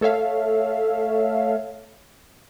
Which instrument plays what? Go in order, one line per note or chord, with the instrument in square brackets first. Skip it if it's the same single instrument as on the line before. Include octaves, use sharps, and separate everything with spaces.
[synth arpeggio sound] A3 A4 C#5 E5 F5